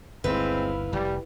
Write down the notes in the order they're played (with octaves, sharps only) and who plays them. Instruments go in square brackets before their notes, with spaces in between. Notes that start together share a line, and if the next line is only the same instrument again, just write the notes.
[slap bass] G1 D#2 [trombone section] G#3 C4 [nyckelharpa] E4 F5 [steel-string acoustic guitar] B4
[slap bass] F1 [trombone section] G3